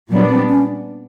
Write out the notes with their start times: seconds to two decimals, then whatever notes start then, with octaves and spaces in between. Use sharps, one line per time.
0.11 A#2 F#3 G3 B3 D4
0.30 C4
0.49 C#4